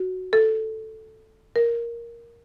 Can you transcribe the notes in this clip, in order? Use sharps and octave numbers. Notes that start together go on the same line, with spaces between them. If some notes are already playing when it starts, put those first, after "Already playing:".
Already playing: F#4
A4
A#4